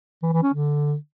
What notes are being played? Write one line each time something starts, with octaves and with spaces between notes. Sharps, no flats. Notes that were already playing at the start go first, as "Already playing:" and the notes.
E3
E3
C#4
D3